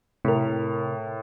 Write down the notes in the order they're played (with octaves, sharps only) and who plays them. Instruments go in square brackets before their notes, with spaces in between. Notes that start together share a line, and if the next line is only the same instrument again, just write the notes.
[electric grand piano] A2 [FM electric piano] C3 A#4